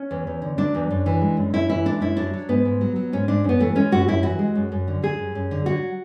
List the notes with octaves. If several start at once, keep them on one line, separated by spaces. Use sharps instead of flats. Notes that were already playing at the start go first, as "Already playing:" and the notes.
Already playing: C#4
E2
E2
D3
F#3 D4
E2
F#2
E3
G#3
F#2
F#2 E4
E3 E4
G#3 D4
F#2 E4
F#3 D4
F#3
G#2 B3
G#2
F#3
F#3
G#2 C#4
G#2 D4
F#2 B3
E3 A3
G#3 C#4
F#2 F#4
F#2 E4
E3 F#4
G#3
F#2
F#2
D3
F#3 G#4
F#2
F#2
D3
F#3 F#4